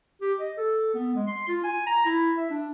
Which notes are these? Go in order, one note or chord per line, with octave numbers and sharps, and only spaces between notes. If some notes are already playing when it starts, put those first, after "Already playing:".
G4
D#5
A4
B3
G#3
C6
F4
G#5
A#5
E4
E5
D4